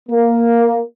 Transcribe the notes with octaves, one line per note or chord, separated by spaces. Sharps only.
A#3